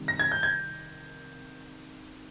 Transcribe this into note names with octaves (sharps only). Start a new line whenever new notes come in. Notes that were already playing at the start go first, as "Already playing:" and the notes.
Already playing: C3 D#3 G3
A#6
G#6
G6
G#6